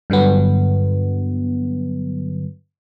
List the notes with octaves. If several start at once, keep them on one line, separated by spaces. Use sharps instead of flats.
G2 D3 F#3 B3